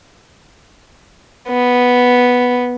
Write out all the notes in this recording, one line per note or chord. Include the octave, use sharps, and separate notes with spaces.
B3